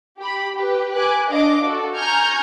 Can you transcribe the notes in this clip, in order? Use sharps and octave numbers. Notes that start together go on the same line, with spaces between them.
G4 B5
G4 B4
B4 G#5 D6 F#6
D4 D#5 F5 D6
F#4 A4
G#5 A#5 C#6 F6 G6 G#6